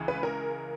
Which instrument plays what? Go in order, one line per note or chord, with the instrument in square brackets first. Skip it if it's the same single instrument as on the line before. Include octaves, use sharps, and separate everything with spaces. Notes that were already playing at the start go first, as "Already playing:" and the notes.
Already playing: [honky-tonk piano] C#2 C#3 E3
B4
A#4